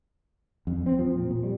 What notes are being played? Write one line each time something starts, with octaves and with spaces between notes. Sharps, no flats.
F2
C4
F3
A#2
A#2
G3